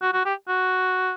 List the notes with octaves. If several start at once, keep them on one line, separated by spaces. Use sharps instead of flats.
F#4
F#4
G4
F#4